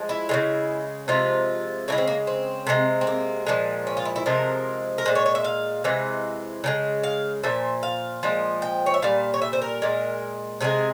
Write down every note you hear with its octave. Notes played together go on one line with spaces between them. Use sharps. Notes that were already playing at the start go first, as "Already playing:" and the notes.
Already playing: F3 G#3
E4
C#3 F3 G#3
C3 F3 G#3 F4
C#3 F3 G#3 E4
C4
A#3
C4
C3 E3 G#3
C4
A#3
A#2 F3 G#3
C#4
F4
E4
E4
C3 F3 G#3 A#4
A#4
A#2 G#3 C5
C#5
C#5
E5
F5
C3 E3 G#3
C#3 F3 G#3
F5
A#2 F3 E5
F5
A#2 F3 G#3
G5
C#5
E5
A#2 G3 F5
C#5
E5
C5
A#4
A#2 G#3
C3 F3 G#3 G#4